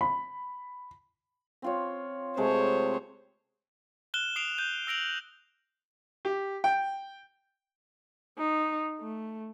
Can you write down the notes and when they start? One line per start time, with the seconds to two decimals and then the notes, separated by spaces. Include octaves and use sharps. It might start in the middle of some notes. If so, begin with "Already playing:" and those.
0.01 B5
1.62 C4 F4 C#5
2.37 C3 G#3 A3 C5 C#5
4.14 F6 F#6 E7 G7
4.36 D#6 C7 D7 F7
4.58 G6 D#7
4.87 E6 A#6 D7 F7 F#7
6.25 G4
6.64 G5
8.38 D#4
9.00 A3